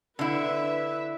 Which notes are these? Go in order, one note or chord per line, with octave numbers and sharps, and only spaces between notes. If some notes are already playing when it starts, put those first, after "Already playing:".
D3 E4 B4 E5